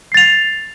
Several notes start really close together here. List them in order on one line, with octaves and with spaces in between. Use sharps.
C7 A6 F7